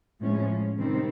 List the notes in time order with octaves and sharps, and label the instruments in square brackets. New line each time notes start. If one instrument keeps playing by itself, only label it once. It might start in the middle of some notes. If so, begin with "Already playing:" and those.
[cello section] A2 F3 G#3 C#4
C3 D#3 G3 C4